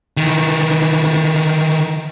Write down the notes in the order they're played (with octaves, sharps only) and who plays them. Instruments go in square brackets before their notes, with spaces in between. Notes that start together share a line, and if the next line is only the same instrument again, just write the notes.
[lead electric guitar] D#3 E3